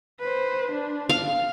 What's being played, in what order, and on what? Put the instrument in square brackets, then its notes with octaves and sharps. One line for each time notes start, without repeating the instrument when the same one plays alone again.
[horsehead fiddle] B4 C5
D4
[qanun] F5